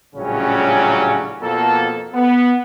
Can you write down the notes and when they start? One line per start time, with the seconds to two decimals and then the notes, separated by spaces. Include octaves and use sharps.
0.15 A#1 A2 C#3 F#3 G3 C#4
1.42 F2 B2 A#3 A4
2.13 B3